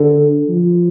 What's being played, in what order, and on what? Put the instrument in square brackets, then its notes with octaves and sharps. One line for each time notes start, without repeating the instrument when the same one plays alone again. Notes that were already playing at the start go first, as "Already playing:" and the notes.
Already playing: [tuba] D3
F3